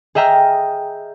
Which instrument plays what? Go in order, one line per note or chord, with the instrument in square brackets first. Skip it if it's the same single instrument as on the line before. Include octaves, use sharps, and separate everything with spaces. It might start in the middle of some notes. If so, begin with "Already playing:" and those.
[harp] G#4 D#5 E5 G5 A#5 F6